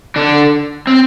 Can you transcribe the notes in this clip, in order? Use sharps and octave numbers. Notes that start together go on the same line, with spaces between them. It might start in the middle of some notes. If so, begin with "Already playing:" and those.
D3 D4
C4